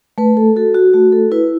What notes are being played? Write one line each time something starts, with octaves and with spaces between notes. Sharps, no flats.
A3 B4
A4
F#4 A4
F#4
A3 F#4
A4
E4 B4